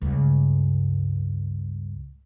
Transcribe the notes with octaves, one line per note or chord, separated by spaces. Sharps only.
C#2 G2